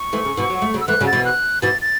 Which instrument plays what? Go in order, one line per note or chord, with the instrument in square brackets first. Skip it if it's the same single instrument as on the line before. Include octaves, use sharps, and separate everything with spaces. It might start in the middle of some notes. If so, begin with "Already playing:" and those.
Already playing: [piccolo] C#6
[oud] E3 A3
C#3
B2 E3
F#3
A3
C#3 F#3
[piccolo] E6
[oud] E3 A3 [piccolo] F#6
[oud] C#3 F#3
[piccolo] A6
[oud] B2 E3
[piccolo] F#6
[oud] B2 E3 [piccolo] A6
[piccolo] A6